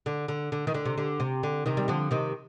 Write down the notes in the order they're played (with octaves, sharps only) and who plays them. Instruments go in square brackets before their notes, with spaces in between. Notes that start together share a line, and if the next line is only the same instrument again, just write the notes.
[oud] D3
D3
D3
D#3
D3
C3
D3
C3
D3
C3 D#3
G3
D3 F3
C3 D#3